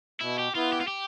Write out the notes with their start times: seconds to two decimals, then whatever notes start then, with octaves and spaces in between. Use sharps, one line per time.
0.21 B2 E4
0.39 G4
0.55 B3 E4 F4
0.73 G4
0.81 F4
0.88 G4